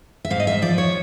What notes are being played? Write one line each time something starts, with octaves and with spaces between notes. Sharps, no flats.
E5
G#2 F5
D#5
E5
F3 D5
C#5